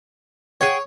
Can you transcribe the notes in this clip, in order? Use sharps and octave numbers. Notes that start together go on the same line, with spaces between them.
G#4 C#5 F#5 G5